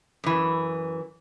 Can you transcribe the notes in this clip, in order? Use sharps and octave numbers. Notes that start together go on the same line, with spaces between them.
F#2 E3